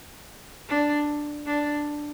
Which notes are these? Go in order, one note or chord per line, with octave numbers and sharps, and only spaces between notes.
D4
D4